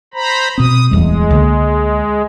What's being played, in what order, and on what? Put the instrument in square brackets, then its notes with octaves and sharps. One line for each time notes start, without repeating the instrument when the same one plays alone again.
[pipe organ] C5 A#5 B5
[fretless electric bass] B2 C4 [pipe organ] D#6
[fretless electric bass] D1 E2 G3 [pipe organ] G#3
[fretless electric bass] C#2 D3 A#3